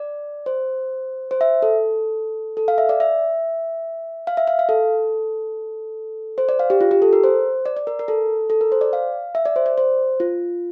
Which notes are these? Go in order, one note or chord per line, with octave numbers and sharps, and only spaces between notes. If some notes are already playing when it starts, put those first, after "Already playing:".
Already playing: D5
C5
C5
E5
A4
A4
F5
E5
D5
E5
F5
E5
F5
F5
A4
C5
D5
F5
G4
F4
G4
A4
A#4
C5
D5
D5
A#4
A#4
A4
A4
A#4
C5
D5
F5
E5
D5
C5
D5
C5
F4